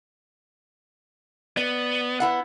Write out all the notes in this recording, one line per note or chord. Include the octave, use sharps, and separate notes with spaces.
B3 D5
B3 E4 F#5